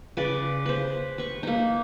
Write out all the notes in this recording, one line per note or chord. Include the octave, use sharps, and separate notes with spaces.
C#3 B4 D5
B4 C5
B4 C#6
A#3 D#4